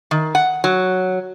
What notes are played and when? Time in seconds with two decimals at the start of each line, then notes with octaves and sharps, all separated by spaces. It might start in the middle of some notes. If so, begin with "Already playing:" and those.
0.11 D#3
0.35 F#5
0.64 F#3